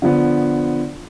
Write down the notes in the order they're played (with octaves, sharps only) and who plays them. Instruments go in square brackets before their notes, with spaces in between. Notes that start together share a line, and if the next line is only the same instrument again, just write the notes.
[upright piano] D3 F3 B3